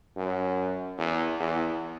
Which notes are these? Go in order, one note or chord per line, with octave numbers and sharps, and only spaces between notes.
F#2
E2
E2